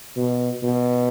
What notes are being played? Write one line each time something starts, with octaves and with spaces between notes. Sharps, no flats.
B2
B2